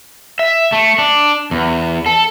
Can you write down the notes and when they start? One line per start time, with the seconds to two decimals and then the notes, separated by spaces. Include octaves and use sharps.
0.39 E5
0.72 A3
0.98 D4
1.51 E2
2.06 A4